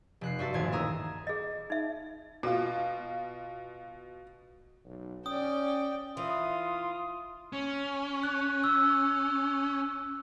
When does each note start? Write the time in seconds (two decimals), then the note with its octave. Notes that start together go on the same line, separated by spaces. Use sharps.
0.21 F1 F#6 C7
0.39 G2 F4 F#4 E5 A5
0.54 D#1 A1 F5 G#6
0.72 A#4 A#5 D#6 E6
1.27 G#4 D#5
1.70 D#4 E5
2.43 B2 F4
4.85 B1
5.26 C#4 D5 G5 D#6
6.17 E3 F4 D#6
7.53 C#4
8.23 F#6
8.64 E6